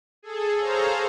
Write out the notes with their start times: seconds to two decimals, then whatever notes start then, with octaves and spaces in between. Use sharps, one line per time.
0.23 G#4 A4
0.58 G#4 A4 C5 C#5 F5 A#5